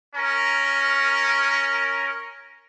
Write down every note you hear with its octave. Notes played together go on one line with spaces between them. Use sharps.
C#4 A#4